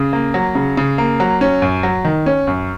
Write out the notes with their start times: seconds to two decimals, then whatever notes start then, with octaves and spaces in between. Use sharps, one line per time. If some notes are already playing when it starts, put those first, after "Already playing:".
Already playing: C#3
0.13 A#3
0.34 F#3
0.55 C#3
0.77 C#3
0.98 A#3
1.20 F#3
1.41 C#4
1.62 F#2
1.83 F#3
2.05 D#3
2.26 C#4
2.47 F#2